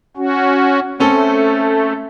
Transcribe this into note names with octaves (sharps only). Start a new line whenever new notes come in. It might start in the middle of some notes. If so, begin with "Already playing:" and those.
C#4 F#4
A3 C4 C#4 A4